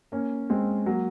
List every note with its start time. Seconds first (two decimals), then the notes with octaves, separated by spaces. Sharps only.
0.12 A#3 C#4
0.50 G#3 C4
0.86 F#3 A#3